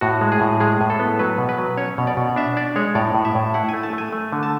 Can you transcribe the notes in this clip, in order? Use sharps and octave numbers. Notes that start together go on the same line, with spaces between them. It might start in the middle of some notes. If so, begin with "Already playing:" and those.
A2 F#4
G#3
G#4
A2
G#3 G#4
A2
A4
B3
F#3 B4
B2
B4
F#3
C#4 C#5
B2
D5
B2
D4 E5
D4 D5
G#3 C#5
A2 D5
A2
E5
A2
E4 F#5
A3 G#5
A5
A3 G#5
A3
D3
A5